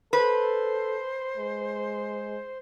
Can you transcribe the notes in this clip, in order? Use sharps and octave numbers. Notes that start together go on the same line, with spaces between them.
A4 B4 C5
G#3